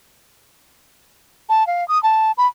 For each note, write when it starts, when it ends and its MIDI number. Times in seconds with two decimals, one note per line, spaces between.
1.49 1.66 81
1.67 1.87 77
1.88 2.01 87
2.03 2.32 81
2.38 2.47 83